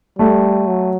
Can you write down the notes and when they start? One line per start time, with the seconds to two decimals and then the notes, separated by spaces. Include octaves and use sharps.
0.19 G3 A3
0.67 F#3